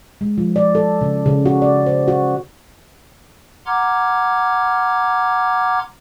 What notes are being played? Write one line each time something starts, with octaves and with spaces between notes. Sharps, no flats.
G#3
F3
D5
A4
C#3
C#3
F#4
D5
C5
F#4
F#5 A#5 C6 D6 F6 G#6